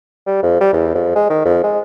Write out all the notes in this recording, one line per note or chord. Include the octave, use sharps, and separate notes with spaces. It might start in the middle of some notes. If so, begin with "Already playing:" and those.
G3
F2
G3
E2
F2
G#3
D#3
F2
G#3